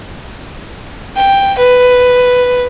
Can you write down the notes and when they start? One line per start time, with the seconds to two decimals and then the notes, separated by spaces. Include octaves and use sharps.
1.16 G5
1.58 B4